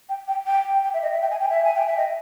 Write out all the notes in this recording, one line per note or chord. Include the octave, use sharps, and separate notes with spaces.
G5
G5
G5
G5
E5
D#5
E5
G5
G#5
G5
E5
G#5
G5
E5
D#5